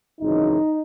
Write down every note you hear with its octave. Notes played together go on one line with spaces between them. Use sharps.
G#1 F#2 C#3 E3 D#4